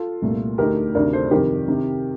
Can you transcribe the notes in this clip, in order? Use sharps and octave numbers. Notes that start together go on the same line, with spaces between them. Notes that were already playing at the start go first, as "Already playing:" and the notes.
Already playing: F4 A4
C2 A#2 A3
D2 D3 A3 D#4 G4 A#4
D2 C3 D#3 A#4 D5
A4 C5
F2 C3 D#3 G4 A#4
C3 D#3